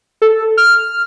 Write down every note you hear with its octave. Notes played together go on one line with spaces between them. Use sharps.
A4
F6